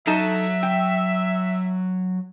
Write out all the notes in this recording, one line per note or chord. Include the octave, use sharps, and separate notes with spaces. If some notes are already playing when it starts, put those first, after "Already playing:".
F#3 D#4 A4 E5 A5
G5